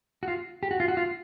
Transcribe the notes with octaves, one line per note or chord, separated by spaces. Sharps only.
F#4
F4
G4
F#4
F4
F#4
F4